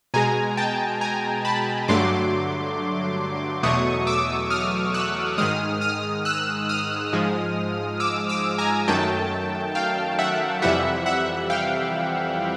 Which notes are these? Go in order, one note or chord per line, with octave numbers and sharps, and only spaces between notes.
B2 G#3 G#5 A#5
G5 A5
G#5 A#5
A5 B5
G2 D3 F#3 A3 C6 D6
E2 B2 F#3 A3 C#6 D#6
D6 E6
D#6 F6
E6 F#6
G#2 D#3 G#3 D#6 F6
D#6 F6
E6 F#6
D#6 F6
G#2 F3 G#3
D6 E6
D6 E6
G#5 A#5
F#2 D#3 F#3 A3 G5 A5
F5 G5
E5 F#5
F2 C3 E3 G3 E5 F#5
E5 F#5
F5 G5